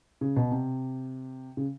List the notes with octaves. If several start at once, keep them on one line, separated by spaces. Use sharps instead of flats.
C#3
B2
C3
C#3